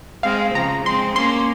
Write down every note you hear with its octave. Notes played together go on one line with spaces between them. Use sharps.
G#3 C4 F5
C#3 F3 A#5
G#3 C4 C6
A#3 C#4 C6